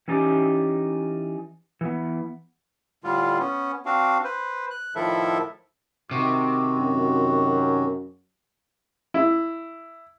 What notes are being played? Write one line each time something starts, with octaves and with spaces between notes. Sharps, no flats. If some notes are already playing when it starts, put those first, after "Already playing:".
E3 C#4 D#4 G4 D5
E3 B3
A2 D3 G3 F4
B3 C#4
C4 D4 F#4 F5
B4 C5
F#6
A2 D#3 F3 E4 A4 E5
C3 D#3 F#4
F#2
E4